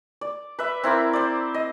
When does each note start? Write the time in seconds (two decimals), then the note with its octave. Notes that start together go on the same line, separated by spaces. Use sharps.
0.21 D5
0.59 B4 E5
0.84 C4 E4 A#4 D6
1.13 C5 D5
1.54 D#5